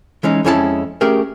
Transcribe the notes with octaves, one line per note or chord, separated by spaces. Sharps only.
E3 G#3 C#4 D#4
F2 G#3 C#4 E4 G#4 A5
A3 C#4 G4 G#4 A#4